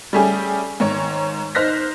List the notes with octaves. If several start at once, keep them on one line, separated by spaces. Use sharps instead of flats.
G3 A3 C#4 G4 G#4
G#2 D#3 C#5
D#4 C5 F6 F#6 A#6 B6